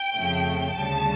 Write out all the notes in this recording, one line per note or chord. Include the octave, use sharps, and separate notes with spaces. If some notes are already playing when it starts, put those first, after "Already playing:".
Already playing: G5
F2 C#3 F3 A3
D2 C#3 G3 A5